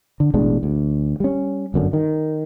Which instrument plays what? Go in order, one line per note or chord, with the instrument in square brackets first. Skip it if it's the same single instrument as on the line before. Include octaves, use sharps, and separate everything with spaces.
[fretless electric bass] D3
A1 B2 G#3 D4
D2
G3 C#4
G1 F#2 D3
D#3